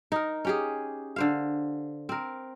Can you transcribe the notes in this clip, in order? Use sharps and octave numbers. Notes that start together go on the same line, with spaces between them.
D#4 A#4
C#4 G4 G#4
D3 C5 F5
C4 A#4